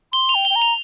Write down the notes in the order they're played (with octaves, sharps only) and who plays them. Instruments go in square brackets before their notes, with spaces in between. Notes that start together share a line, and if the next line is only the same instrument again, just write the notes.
[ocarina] C6 [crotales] G7
[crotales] F7
[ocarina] G5
[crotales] G7
[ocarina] G5
A#5
[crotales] F7